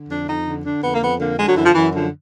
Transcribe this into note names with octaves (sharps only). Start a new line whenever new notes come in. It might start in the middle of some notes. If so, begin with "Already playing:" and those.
Already playing: D3
F2 D4
F2 D#4
D3
D3 D4
F2 B3
A#3
F2 B3
D3 A#3
D3 G#3
F#3
F#2 E3
F3
F#2 E3
D3 F3